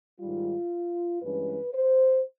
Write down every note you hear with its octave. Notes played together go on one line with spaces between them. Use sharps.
G#2 D#3 G3 F4
G2 E3 G#3 C#4 B4
C5